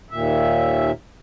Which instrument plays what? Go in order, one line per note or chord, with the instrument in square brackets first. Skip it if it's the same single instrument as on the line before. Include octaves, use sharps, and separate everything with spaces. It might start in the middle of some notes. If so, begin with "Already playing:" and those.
[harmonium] D#2 A#2 E5